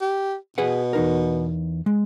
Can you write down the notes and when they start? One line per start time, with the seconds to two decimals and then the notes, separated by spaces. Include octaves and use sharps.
0.01 G4
0.58 B2 G#4 B4 F#5
0.93 E2 D#4 A#4
1.86 G#3